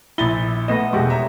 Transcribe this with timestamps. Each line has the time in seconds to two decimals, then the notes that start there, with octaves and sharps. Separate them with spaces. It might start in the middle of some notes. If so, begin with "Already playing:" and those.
0.18 A#1 E4 A6 G7
0.68 A3 B3 D#5
0.93 E1 E2 G#3 F#4 G4
1.10 C#5 E5 A#5